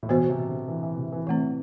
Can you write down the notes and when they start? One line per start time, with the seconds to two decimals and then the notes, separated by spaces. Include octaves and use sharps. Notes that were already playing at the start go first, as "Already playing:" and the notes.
0.03 A2
0.09 B2 E3 B3 F#4 C5
0.29 C3
0.48 D3
0.68 E3
0.83 E3
0.98 C3
1.12 E3
1.27 E3 A3 C4